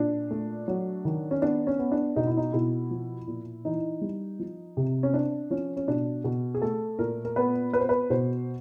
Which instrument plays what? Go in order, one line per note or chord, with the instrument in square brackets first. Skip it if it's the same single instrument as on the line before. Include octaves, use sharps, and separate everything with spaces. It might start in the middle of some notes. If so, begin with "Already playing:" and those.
Already playing: [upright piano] A#2 D4
A3
F#3
D#3
C#4
B3 D4
C#4
B3
D4
B2 D#4
E4
D#4
B2 E4
F3
A#2
E3 D#4
G3
F3
C3
C#4
C4 D4
F3 C#4
C#4
B2 D4
B2
G#4
A3 A4
A#2 A#4
A#4
B3 B4
B3 B4
C5
B4
B2 C5